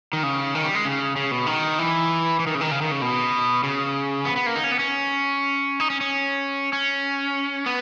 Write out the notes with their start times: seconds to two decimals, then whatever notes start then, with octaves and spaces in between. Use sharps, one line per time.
0.13 D#3
0.23 C#3
0.55 D#3
0.65 G3
0.75 G#3
0.85 C#3
1.16 C#3
1.31 B2
1.46 D#3
1.79 E3
2.40 E3
2.47 D#3
2.55 C#3
2.61 D#3
2.71 C#3
2.81 D#3
2.92 C#3
3.02 B2
3.63 C#3
4.25 B3
4.36 B3
4.46 A#3
4.56 D#4
4.64 C#4
4.72 B3
4.79 C#4
5.80 D#4
5.90 C#4
6.01 C#4
6.73 C#4
7.66 B3